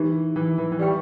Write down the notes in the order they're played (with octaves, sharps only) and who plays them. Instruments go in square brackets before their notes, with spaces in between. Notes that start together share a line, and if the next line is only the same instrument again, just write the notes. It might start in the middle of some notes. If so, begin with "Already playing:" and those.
Already playing: [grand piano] E3 [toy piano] D#4 G4 A#4
[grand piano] E3
E3
E3
[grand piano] G3 [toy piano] G4 B4 G5 C#6